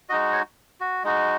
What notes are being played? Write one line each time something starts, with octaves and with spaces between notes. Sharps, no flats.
G#3 D#4 F#4 D#5
C#5
F#4
G#3 D#4 F#4